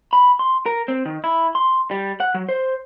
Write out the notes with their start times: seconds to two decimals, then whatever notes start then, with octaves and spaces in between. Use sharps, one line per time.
0.13 B5
0.39 C6
0.66 A#4
0.88 C4
1.05 D#3
1.24 E4
1.55 C6
1.91 G3
2.20 F#5
2.35 F#3
2.49 C5